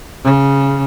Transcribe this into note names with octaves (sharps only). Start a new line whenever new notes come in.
C#3